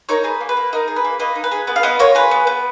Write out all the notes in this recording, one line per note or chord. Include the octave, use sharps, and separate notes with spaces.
D#4 A#4 C#5
G#4 B4
A#3
B4
A#3
D#4 A#4
G#4
B4
A#3
A#3 B4 D#5
D#4
B4
G#4
B3 B4
F5
B3 B4 D#5
F4 A#4 C#5
G#4 B4
B3
B3